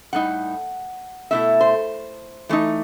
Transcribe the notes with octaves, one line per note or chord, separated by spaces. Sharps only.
A2 G3 D#4 F#5
B2 A3 E4 E5
C5
E3 A3 D#4